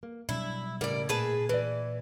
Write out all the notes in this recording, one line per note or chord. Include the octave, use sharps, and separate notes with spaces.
A#3
B2 F#3 G3 D4 E4
A2 C#3 G3 A#4 D5
A#2 G#4 B4 A5
E3 B4 D5